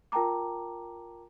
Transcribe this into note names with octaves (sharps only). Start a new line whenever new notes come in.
F4 A#4 G5 A5 A#5 D6